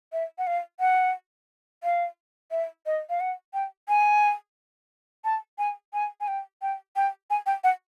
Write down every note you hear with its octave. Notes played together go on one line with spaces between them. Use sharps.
E5
F#5
F5
F#5
F5
E5
D#5
F5
F#5
G5
G#5
A5
G#5
G#5
G#5
G5
G5
G5
G#5
G5
F#5